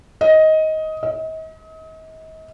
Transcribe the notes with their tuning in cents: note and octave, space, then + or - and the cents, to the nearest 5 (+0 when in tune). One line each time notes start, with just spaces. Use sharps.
D#5 +15
D#5 +40